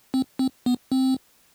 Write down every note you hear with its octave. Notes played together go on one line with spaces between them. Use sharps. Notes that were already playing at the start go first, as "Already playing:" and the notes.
C4
C4
B3
C4